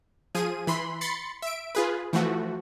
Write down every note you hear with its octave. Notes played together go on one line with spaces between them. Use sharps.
F3 G#4 D#7
E3 B5 C6
B5 C6 A6 C#7
E5 D7
F4 G#4 B4
E3 F3 A3 F#4